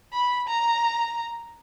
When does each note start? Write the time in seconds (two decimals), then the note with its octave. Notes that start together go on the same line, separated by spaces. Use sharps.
0.13 B5
0.48 A#5